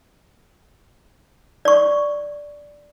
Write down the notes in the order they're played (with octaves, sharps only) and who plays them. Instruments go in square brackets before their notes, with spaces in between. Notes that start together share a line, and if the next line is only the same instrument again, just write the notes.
[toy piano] D5 C#6